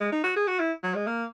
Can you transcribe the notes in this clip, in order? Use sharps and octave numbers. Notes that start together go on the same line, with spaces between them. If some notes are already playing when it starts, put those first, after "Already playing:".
G#3
D#4
F#4
G#4
F#4
E4
F#3
G#3
A#3